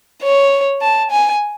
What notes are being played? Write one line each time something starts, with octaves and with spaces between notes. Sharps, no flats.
C#5
A5
G#5